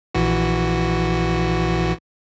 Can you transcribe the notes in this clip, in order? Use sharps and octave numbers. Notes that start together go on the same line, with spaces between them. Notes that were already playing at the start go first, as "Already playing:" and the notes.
A#1 E3 F#4